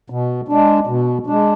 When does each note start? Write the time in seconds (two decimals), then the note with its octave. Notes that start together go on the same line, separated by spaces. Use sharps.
0.10 B2
0.48 G#3 D4
0.87 B2
1.27 G#3 D4